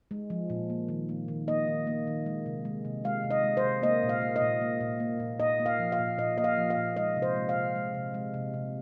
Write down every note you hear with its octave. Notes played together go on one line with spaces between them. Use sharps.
G#3
F3
A#2
A#3
D#3
A#3
D#3
A#3 D#5
D#3
A#3
D#3
G#3
C3
G#3
C3
G#3 F5
C3
D#5
G#3
C5
C3
A#3 D#5
A#2
F5
A#3
D#5
A#2
A#3
A#2
A#3
A#2
A#2 D#5
A#3
F5
F3
F5
A#2
A#2 D#5
A#3 D#5
F5
F3
F5
A#2
G#3 D#5
C3
C5
G#3
F5
C3
G#3
C3
G#3
C3
C3